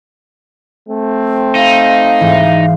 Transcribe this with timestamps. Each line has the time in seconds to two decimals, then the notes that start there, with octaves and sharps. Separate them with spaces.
0.89 A3 C4
1.55 D#4 F5
2.20 G#2 E3